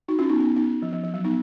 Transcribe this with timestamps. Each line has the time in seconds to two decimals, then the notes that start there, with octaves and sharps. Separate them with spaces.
0.08 D#4 F#4
0.19 C#4 F4
0.29 B3 D#4
0.40 B3 D#4
0.56 B3 D#4
0.82 F3
0.93 F3
1.03 F3
1.14 F#3
1.24 B3 D#4